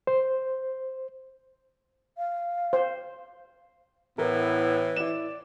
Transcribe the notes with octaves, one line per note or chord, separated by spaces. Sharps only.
C5
F5
C5
A2 E3 B3 A#4
E4 D5 E7